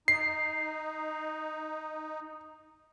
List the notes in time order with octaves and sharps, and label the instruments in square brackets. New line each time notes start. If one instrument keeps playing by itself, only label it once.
[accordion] D#4 [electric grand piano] C7